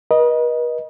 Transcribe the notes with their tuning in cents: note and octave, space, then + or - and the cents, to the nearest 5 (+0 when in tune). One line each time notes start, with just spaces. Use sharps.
B4 -45 D#5 +0